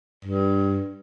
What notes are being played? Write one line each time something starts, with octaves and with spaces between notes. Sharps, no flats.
G2